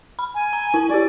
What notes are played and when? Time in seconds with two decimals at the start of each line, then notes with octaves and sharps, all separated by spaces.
0.19 B5
0.35 G#5
0.53 A#5
0.74 E4 A5
0.90 E4 G4 D5